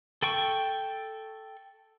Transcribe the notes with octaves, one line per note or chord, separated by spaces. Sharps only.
A4 G5 C#6